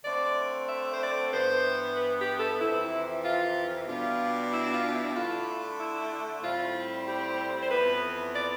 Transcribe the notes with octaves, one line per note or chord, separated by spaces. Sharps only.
D3 A3 C4 D5
E5
C5
D5
G2 E3 B3 C5
B4
G4
A4
F2 C3 E3 E4
F4
B2 G3 D4 F4
E4
F4
E4
D3 A3 E4 F4
E4
A2 G3 C4 E4 F4
G4
C5
F2 E3 B3 B4
D5